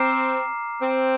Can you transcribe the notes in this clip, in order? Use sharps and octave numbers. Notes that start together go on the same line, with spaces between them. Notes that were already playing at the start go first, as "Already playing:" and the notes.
Already playing: C4 A#5 D6 F6 C7 E7
C4